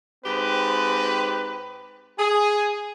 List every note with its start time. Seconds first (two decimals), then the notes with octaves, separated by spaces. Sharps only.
0.25 G#2 C4 G4 B4
2.18 G#4